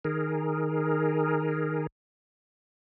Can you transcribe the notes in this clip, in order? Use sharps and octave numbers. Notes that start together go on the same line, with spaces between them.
D#3 G#4 A#4